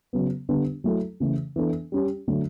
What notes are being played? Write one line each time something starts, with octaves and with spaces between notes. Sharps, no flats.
C#3 F#3 B3
D3 G3 B3 D4
F#3 A3 E4 A4
C#3 E3 A3
E3 B3 D4 A4
G3 C#4 G4
D3 F#3 A3